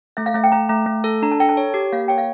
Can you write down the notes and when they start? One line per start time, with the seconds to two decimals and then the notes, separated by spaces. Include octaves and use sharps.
0.17 A3 E5
0.26 F5
0.34 A3 E5
0.43 G5
0.52 A3 A#5
0.69 A3 A#5
0.87 A3
1.04 A4
1.22 D4 A#5
1.32 A5
1.40 A4 G5
1.49 A5
1.57 C#5
1.74 G4
1.93 A#3 F5
2.08 C#5 G5
2.18 F5